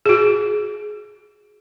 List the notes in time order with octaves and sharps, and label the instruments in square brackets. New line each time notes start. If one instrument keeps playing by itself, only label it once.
[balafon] F#4 G#4